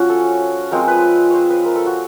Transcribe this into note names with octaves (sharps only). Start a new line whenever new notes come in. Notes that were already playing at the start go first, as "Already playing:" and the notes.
Already playing: F3 C#4 F#4
A4
F3 G#3 C4 F4 A#4
B4
C5 C#5
B4
A#4
A4
F#4